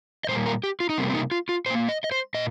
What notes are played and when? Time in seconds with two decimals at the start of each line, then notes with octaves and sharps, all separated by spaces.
0.25 D#5
0.29 A#2 G3 A#3 C5
0.46 A#4
0.64 G4
0.80 F4
0.89 D#4
0.98 C3 G3 A#3 C4
1.09 C4
1.15 D#4
1.31 F4
1.49 F4
1.66 A#2 A#3 C5
1.89 D#5
2.04 D#5
2.12 C5
2.34 A#2 D#5